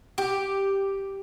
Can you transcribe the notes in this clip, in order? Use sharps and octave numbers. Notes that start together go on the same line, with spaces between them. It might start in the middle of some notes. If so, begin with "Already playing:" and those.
G4